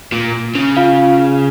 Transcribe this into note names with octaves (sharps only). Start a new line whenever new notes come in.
A#2
C#3
F4 F5